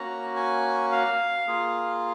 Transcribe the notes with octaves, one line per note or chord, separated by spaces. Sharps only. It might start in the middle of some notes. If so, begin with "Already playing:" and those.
Already playing: A#3 C#4 F#4 A#5
G#5
F5
A#3 F4 G#4